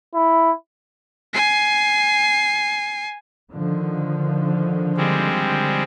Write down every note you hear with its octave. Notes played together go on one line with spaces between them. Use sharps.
E4
G#5 C7
D3 D#3 F3
G3 G#3 C4